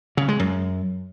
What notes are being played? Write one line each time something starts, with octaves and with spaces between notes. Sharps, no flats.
C#3
G#3
F#2